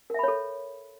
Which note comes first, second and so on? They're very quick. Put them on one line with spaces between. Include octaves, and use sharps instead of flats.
A#4 E5 B5 C#5 A4